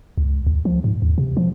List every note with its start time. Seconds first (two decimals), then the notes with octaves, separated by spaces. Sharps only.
0.18 C#2
0.47 D2
0.65 F3
0.84 G#2
1.02 D#2
1.18 C3
1.37 F3